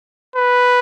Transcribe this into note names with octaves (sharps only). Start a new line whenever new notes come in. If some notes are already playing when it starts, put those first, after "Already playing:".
B4